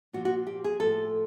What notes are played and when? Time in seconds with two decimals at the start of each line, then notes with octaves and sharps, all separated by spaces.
0.13 A#2 F3 F#4
0.25 F#4
0.47 G4
0.64 G#4
0.80 A2 F3 A4